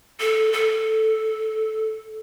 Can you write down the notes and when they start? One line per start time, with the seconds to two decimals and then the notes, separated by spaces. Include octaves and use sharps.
0.20 A4
0.53 A4